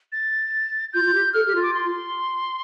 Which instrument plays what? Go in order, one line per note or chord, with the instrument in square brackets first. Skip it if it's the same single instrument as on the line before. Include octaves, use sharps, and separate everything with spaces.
[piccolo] A6
[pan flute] F4 [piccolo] G6
[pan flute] F4
G4
[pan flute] A4 [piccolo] F6
[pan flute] G4
F4
[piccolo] D6
C6